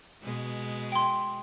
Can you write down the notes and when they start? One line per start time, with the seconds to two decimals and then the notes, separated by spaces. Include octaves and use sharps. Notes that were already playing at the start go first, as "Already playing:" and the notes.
0.23 B2 G#3
0.92 G5 C6